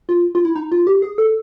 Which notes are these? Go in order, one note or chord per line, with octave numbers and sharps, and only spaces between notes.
F4
F4
E4
D#4
F4
G4
G#4
A4